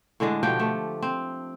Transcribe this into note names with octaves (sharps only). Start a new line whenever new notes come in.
A2 D3 G#3 D4
B2 F3 G4 G5
A3
C4